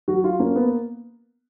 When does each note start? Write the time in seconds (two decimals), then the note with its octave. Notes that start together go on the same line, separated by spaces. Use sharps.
0.08 F#3 F#4
0.24 F4
0.40 A#3 C#4
0.56 B3